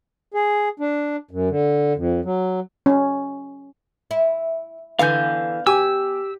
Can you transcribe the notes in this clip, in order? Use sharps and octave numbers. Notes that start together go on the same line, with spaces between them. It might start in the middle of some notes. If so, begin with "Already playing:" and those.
G#4
D4
F#2
D3
F2
F#3
C#4
E4
D3 E3 B3 F5 G#5 G6
G4 G#5 D6 E6